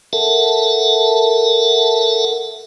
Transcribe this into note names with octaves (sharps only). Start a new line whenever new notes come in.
A4 A#4 E5 F#5 A5